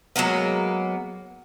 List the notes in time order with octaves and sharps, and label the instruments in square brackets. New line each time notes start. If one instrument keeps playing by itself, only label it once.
[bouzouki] F#3 G#3 A#3 B3